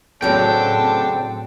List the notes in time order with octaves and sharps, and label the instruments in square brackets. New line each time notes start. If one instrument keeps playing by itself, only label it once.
[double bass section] A2 C4 [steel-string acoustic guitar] C#3 F#3 [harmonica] D4 A4 [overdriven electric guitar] G5